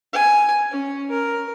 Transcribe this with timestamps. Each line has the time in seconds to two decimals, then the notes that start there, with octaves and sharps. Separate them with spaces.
0.13 G#5
0.71 C#4
1.11 A#4